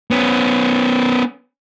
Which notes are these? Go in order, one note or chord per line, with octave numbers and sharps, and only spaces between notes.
B3 C#4